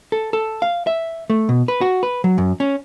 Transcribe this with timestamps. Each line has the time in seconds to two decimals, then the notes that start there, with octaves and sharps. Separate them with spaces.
0.12 A4
0.33 A4
0.62 F5
0.87 E5
1.30 A3
1.49 B2
1.68 B4
1.81 F#4
2.03 B4
2.24 F#3
2.38 F#2
2.60 C#4